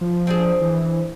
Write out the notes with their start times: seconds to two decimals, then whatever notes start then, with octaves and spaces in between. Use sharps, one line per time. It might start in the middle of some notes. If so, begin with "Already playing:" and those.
0.01 F3
0.27 C4 D4 G#4
0.62 E3